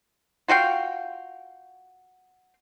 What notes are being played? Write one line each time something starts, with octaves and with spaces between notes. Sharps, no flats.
F4 F#4 F5 G5